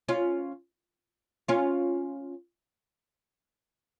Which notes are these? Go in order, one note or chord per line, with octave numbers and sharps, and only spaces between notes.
C#4 F4
C#4 F4